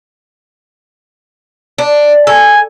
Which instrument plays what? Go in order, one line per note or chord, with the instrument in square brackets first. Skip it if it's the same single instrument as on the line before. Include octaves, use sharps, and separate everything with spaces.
[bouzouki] D4
[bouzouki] A4 [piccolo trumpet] G#5